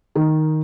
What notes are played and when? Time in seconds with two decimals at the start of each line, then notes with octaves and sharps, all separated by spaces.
0.15 D#3